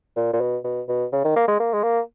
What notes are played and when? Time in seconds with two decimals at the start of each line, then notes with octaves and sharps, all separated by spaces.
0.16 A#2
0.33 A#2
0.41 B2
0.65 B2
0.88 B2
1.13 C#3
1.24 D#3
1.36 A#3
1.48 G#3
1.60 A#3
1.73 G#3
1.83 A#3